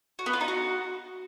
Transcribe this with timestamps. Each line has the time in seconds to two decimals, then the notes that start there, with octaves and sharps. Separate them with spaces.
0.19 F#4
0.26 B3
0.33 F4
0.41 D#4
0.48 F#4